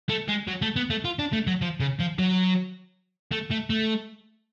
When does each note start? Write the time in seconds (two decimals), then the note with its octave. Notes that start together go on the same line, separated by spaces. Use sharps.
0.09 A3
0.29 G#3
0.48 F#3
0.62 A3
0.76 B3
0.90 A3
1.05 F4
1.19 D4
1.33 A3
1.47 F#3
1.62 F3
1.80 C#3
2.00 F3
2.19 F#3
3.32 A3
3.51 A3
3.70 A3